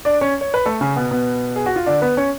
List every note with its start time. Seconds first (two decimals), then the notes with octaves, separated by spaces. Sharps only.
0.05 D4 D5
0.21 C#4 C#5
0.41 C#5
0.54 B4
0.66 A3 A4
0.81 C#3 C#4
0.96 B2 B3
1.11 B2 B3
1.56 G#4
1.66 F#4
1.76 F4
1.86 D3 D4
2.02 B3 B4
2.17 C#4 C#5